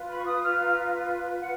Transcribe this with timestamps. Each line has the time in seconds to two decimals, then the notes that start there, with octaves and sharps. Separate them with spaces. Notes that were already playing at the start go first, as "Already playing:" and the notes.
Already playing: F4 B4
0.08 B5
0.17 C#6
0.23 D#6
0.42 F6
0.61 A#5
1.40 F#5